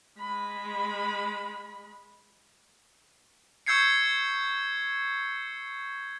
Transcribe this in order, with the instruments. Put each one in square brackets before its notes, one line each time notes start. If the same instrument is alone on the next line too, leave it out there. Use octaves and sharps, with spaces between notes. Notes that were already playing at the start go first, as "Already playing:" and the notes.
[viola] G#3 B5
[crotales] C#6 E6 G6 G#6 C7 C#7